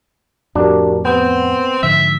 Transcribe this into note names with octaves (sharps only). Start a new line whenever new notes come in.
F2 A2 D4 F#4 G4 A#4
B3 C4 G6
G#2 D3 F3 E5